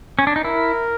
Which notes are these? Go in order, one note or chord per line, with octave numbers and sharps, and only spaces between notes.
C#4
D4
D#4
E4 A#4